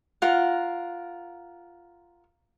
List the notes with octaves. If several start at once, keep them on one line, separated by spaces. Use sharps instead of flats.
F4 A#4 F#5